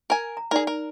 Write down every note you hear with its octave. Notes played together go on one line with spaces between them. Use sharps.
A#4 G#5
A#5
D#4 G#4 A#4 D5
A#4